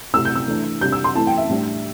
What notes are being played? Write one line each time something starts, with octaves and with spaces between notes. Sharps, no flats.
C3 A3 E4 E6
G6
E6
E3 A3 D4
C3 G3 D4 G6
E6
C6
E3 A3 E4 A5
G5
E5
A2 G3 D4